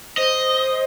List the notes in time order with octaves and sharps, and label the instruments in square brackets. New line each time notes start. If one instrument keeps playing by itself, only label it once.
[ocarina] C5 [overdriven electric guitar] D#5